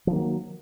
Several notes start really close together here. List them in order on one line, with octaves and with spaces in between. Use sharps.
F3 D#3 A#3 F#3